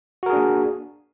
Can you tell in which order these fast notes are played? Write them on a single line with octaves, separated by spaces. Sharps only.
F#4 A#4 G#4 D4 A#3